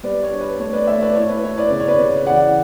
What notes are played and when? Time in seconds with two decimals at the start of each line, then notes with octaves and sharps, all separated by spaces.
0.03 G3 B4 D5
0.23 C#5
0.32 D4
0.41 B4
0.59 A3 C#5
0.73 B4 D5
0.87 A3 C#5 E5
1.02 B4 D5
1.15 E4 C#5
1.29 B4
1.43 E4 C#5
1.58 B4 D5
1.70 C#3 D5
1.80 C#5
1.88 B4 D5
1.99 C#3
2.27 E3 D5 F#5